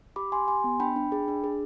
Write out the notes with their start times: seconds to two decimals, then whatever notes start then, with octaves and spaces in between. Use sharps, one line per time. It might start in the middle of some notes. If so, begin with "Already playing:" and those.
0.16 G4 B5 D6
0.32 G4 G#5 C6
0.48 G4 G#5 C6
0.64 B3
0.80 D4 G5 B5
0.96 D4
1.12 G#4
1.28 D4
1.44 G#4